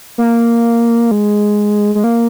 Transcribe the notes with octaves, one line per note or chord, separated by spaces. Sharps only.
A#3
G#3
G#3
A#3